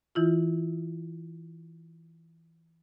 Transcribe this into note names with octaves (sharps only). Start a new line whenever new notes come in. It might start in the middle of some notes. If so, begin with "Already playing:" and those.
E3 E4 F4